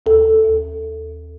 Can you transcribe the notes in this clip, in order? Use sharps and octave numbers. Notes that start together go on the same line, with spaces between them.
D#2 A4
D#2